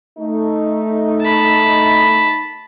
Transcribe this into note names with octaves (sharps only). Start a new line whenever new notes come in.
A3 D#4
A5 B5